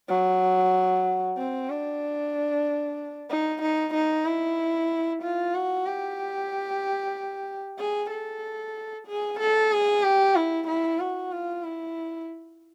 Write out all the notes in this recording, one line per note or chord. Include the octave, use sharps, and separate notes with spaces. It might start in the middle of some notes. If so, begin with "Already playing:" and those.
F#3
C4
D4
D#4
D#4
D#4
E4
F4
F#4
G4
G#4
A4
G#4
A4
G#4
G4
E4
E4
F#4
F4
E4